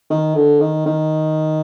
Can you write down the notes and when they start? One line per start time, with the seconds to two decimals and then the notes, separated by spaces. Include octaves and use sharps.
0.10 D#3
0.35 D3
0.60 D#3
0.86 D#3